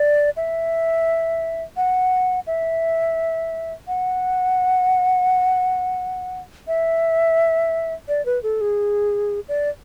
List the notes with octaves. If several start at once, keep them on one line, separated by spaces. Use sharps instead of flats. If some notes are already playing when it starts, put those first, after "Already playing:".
Already playing: D5
E5
F#5
E5
F#5
E5
D5
B4
A4
G#4
D5